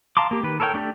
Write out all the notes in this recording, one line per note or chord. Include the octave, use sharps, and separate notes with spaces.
F5 A5 A#5 C6 D6
A#3 G4
D#3 B4
A4 A#4 C#5 E5 G5
A3 D4 G4 A4